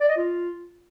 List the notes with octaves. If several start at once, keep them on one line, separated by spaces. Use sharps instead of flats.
D5
D#5
F4